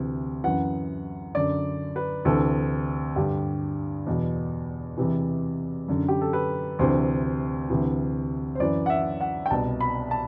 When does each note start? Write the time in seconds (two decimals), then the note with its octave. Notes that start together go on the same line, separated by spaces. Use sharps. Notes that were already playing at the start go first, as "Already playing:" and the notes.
Already playing: D2 C3 E3
0.44 F#2 E3 F#5
1.35 F#2 D3 D5
1.96 B4
2.25 D2 C3 E3 A4
3.16 G2 D3 G4
4.07 E2 B2
4.98 E2 C3 E3
5.88 F#2 D3
6.08 G4
6.21 A4
6.33 B4
6.79 D2 C3 E3 C5
7.70 D2 C3 E3
8.55 C5
8.60 F#2 E3 D5
8.86 F#5
8.90 E5
9.20 F#5
9.46 G5
9.50 C2 B2 A5
9.81 B5
10.11 A5